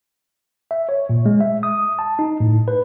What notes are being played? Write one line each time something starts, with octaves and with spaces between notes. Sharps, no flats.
E5
C#5
A#2
G#3
E5
D#6
A5
D#4
A2
B4